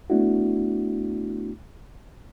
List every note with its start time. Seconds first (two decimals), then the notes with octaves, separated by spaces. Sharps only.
0.10 A3 B3 D4 E4 F#4